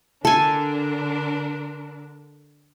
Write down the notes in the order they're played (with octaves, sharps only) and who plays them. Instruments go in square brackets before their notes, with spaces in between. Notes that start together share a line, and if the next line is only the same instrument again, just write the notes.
[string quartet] D3 D4 A#4 [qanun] A4 G#5